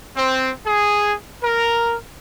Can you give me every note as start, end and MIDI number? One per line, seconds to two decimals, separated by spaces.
0.16 0.51 60
0.66 1.14 68
1.43 1.96 70